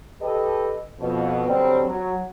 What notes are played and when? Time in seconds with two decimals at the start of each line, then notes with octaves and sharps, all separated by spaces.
0.22 G4 A4 B4 D#5
1.00 F2 B2
1.46 D3 F#3 G3 C4
1.87 F#3